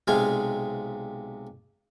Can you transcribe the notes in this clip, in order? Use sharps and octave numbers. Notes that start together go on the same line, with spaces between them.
B1 C3 G#3 F4 F5 G#5